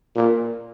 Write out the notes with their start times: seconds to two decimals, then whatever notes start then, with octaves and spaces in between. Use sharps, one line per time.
0.16 A#2